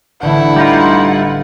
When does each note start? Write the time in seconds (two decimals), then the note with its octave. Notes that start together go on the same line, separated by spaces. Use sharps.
0.21 A1 D3 E4 F#5 G6
0.56 G3 D#4 F4